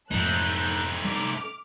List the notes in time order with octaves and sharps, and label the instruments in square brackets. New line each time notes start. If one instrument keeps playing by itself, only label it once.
[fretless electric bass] F2 G#2 [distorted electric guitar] A3 D#4 [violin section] A4 F#6 G6
[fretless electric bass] G3 [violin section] D6 F6